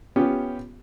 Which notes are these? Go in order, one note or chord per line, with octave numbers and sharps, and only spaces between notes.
B3 C#4 F4 G4